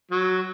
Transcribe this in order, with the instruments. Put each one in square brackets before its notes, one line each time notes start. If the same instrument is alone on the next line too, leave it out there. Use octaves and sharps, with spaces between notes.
[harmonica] F#3